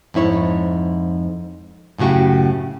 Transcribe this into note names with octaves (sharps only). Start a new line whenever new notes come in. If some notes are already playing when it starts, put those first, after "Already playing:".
F2 G#2 E4 C#5
F#2 A2 C#3 F#4 G4